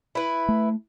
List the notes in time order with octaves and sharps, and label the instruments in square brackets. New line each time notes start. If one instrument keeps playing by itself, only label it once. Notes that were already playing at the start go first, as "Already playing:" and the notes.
[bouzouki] E4 B4
[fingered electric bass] A3